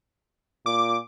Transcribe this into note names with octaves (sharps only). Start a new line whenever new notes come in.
A#2 D6